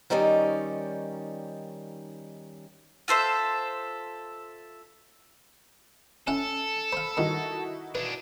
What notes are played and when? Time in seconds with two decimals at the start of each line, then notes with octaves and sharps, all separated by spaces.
0.10 D#3 G3 C#4 D#4 D5
3.08 F4 A4 C5 E5
6.27 C#4 E4 A4 F#5
6.92 C5 F5 B5
7.17 G2 D#3 D#4 E4 F#4
7.95 D4 G#4 B4